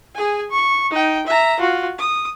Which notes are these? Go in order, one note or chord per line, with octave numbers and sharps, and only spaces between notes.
G#4 G#5
C#6
D#4 G5
E5 A#5
F4 F#4
D#6